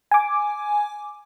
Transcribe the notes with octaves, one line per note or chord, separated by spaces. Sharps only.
G#5 D6